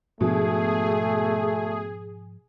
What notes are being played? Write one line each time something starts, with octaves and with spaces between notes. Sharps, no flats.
G#2 B2 F3 A3 D4 G#4